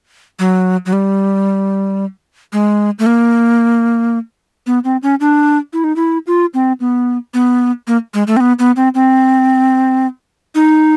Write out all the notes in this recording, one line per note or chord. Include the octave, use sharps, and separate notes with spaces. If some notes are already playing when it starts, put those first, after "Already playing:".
F#3
F#3
G3
G#3
A3
A#3
B3
C4
C#4
D4
E4
D#4
E4
F4
C4
B3
B3
A#3
G#3
A3
C4
B3
B3
C4
C4
D#4